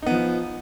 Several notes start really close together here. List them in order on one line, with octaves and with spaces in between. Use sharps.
D#4 B3 F3